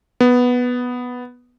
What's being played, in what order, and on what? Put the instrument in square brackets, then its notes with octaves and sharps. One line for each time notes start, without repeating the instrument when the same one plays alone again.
[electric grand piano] B3